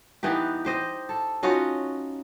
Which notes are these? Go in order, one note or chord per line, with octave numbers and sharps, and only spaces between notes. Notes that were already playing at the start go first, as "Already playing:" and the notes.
E3 B3 D#4 G4
G4 C5 D#5
A4
C#4 D#4 F4 F#4